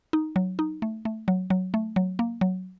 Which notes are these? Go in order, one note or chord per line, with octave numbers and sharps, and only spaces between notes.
D#4
F#3
D#4
A3
A3
F#3
F#3
A3
F#3
A#3
F#3